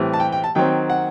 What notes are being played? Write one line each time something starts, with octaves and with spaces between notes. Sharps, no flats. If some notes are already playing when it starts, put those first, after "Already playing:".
Already playing: A2 E3 G3 C4
A5
G5
G5
A5
D#3 F#3 C4 G5
F#5